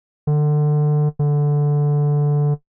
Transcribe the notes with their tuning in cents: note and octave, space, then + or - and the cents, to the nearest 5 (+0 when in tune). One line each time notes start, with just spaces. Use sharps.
D3 +25
D3 -5